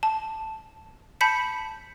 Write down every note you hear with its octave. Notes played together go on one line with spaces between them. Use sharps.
A5
A5 B5 G6 B6 C#7